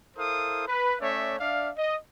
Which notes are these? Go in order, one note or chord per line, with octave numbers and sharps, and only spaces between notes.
E4 A4 A#4 C5 F5 D#6
B4
A3 C#4 C#5 D5 E5
D4 D5 E5 F5
D#5